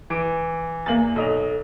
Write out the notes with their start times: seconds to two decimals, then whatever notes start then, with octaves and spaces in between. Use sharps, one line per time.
0.10 E3 D6 D7
0.86 E2 A#3 A6 F#7
1.16 B1 A4 D#5 F7